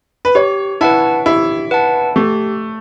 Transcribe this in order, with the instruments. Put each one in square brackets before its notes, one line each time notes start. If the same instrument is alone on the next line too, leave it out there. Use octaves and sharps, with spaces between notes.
[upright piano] B4
[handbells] G4 [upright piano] C#5
[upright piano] E4 [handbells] B4 F#5 A5
[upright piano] E4 [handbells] G4
[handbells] B4 F#5 A5
[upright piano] A3 [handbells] G4